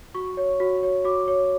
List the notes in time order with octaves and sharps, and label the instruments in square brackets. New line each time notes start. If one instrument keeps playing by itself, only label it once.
[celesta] F#4 C#6
C#5
F#4
C#5
F#4 D6
C#5